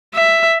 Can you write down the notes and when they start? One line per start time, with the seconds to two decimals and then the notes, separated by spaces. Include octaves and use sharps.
0.15 E5